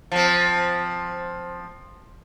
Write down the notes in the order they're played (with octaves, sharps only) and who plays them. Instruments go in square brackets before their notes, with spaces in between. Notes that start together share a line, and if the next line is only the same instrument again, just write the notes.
[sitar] F3 C4